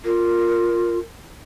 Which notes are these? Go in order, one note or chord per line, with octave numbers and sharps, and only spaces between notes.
F4 A#4